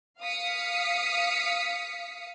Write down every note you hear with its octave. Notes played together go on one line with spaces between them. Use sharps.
F5 D#6 B6 C#7